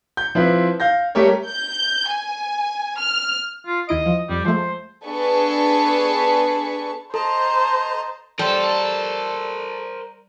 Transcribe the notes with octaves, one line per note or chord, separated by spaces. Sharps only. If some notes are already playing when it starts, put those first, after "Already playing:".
G6
F3 C4 E4 B4
F5 G6 A#6
G3 A3 G4 A#4 C#5
G6
G#5
F6
F4
D#2 E4 D#5 D7
F3
F2 G3
F3 G#3 A3 C5
B3 D4 G#4 A4 B4 C#6
A4 C5 D#5 A5 A#5
G3 A4 A#4 C5